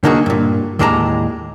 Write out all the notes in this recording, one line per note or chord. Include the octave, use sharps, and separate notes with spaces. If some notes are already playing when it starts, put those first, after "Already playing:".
D3 A#3 D#4 F#4 G#4
G2 A#2
D#2 A2 G#3 D5 A5 A#5